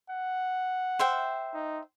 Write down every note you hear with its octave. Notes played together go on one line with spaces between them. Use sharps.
F#5
C5 E5 G5
D#4